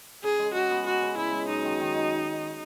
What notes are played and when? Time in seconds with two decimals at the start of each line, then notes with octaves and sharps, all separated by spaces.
0.23 C#3 G#4
0.39 G#3
0.54 G#3 F#4
0.70 B3
0.86 G#3 F#4
1.02 C#3
1.17 C#3 E4
1.32 G#3
1.48 F#2 D#4
1.64 D#3
1.80 D#3